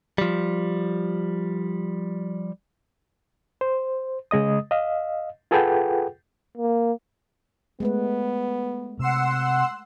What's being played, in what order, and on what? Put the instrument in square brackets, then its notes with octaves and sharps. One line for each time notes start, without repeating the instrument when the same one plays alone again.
[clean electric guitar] F3 G3
[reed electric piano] C5
C#3 G#3 D#5 D#6
D#5 F5
F4 G#4 A4 B4 F#5 G5
[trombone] A#3
[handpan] G#3 A3 B4 [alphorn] B3
[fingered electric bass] C3 [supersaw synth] F#5 C6 E6